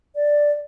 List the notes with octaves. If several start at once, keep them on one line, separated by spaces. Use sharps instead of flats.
D5